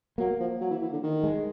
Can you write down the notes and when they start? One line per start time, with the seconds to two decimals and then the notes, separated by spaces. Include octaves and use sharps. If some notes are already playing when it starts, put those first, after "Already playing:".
0.18 F#3 A#3
0.40 F3
0.61 F#3
0.71 E3
0.82 E3
0.92 D3
1.03 D#3
1.23 G#3